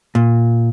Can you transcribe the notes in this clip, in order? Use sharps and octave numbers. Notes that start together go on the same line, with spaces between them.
A#2